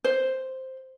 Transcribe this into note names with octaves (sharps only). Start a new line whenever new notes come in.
C5